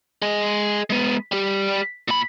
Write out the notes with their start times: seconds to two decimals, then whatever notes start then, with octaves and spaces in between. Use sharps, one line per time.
0.22 G#4 D#5
0.90 G#3 B3
1.32 G3 G4
2.08 A#2 B5